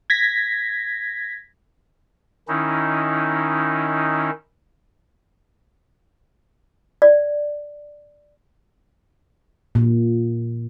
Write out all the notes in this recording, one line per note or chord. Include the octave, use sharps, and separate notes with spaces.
G#6 A#6 B6
D#3 C#4 D#4 E4
D5
A#2